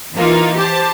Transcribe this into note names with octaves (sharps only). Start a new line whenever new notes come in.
E3 A#3 D#4 F4
G4 C5 A5